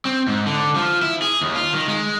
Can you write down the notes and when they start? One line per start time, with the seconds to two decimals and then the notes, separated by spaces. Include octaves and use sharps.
0.05 C4
0.28 G#2
0.46 D3
0.76 F3
1.02 E4
1.22 G#4
1.41 D#2
1.56 F4
1.73 D#3
1.88 G#3